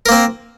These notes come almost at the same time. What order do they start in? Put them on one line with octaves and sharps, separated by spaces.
A#4 A#3 C4